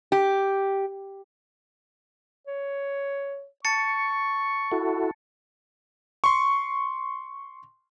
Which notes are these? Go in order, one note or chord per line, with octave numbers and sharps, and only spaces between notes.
G4
C#5
A5 C#6 A6 C#7
E4 F#4 A4
C6 C#6